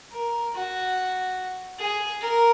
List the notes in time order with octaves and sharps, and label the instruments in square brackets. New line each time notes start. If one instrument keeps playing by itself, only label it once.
[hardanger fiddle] A#4
F#4
G#4
A#4